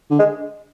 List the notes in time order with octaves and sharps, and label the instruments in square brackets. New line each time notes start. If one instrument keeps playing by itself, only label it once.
[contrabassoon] D3
[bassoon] G#3